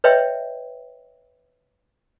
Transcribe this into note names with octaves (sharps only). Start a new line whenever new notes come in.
B4 C#5 D#5 E5 G5